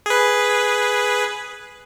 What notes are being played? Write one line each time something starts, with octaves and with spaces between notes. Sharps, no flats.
G#4 B4